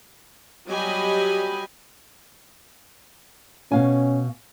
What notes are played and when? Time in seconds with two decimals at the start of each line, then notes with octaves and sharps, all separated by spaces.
0.68 F#3 G3 G4 D#5 G#5 B5
3.72 B2 C#4 F5 G#5